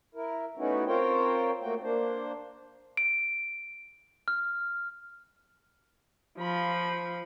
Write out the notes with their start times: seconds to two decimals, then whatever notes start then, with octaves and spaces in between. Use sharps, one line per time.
0.15 E4 A#4
0.57 A3 B3 C#4 D#4 E4 F#4
0.87 C4 F4 A#4 C5 C#5 G5
1.62 A3 A#3 F#4 G5
1.82 A#3 D4 C5
2.97 D7
4.28 F6
6.38 F3 B5